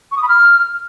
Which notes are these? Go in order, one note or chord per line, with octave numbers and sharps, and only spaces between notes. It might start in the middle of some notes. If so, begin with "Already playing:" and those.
C#6
D#6
B5
F6